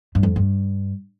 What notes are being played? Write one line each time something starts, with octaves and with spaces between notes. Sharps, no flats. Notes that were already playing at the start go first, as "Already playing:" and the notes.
G2
F2
G2